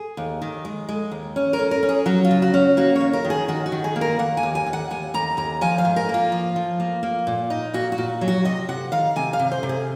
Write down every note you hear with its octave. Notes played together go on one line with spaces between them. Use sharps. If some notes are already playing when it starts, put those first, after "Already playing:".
Already playing: G#4
D#2
D#3
G#3
G#3
D#2
C#4
A#4
C#4
A#4
C#4
G#4
F#3 F#4
F4
C#3
F#4
C#4
A#3 F#4
D#2 C#5
A#4
D#3
G#4
D#3 F#4
F#4
D#3
G#4
A#3
A#4
A#3 F#5
G#5
D#2
G#5
D#2
F#5
D#2 G#5
D#2 A#5
D#2 A#5
F3 G#5
F5
G#2
A#4
A#3 F4
F3
F3
A#3
A#3
A#2
D#4
A#2 F#4
F#4
A#2
F#3
F#4
C3 D#5
C3 F#5
D#3 F5
C3 G#5
F5
C3
C5
C3
G#4